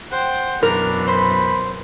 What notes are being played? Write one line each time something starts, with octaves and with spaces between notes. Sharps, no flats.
C5 F#5 G5
F#2 B2 E3 D4 A#4
C5 B5